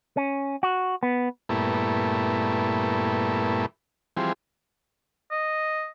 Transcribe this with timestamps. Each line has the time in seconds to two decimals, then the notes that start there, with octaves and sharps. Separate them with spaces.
0.17 C#4
0.63 F#4
1.03 B3
1.49 G2 A#2 A3 B3 E4
4.17 E3 F3 G3 C4 G#4
5.31 D#5